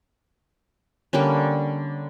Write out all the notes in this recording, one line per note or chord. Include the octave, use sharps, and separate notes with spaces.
D3 G3 A#3 C#4